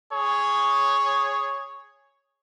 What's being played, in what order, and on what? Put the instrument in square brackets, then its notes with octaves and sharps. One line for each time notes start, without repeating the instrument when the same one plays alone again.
[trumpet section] G#4 C#5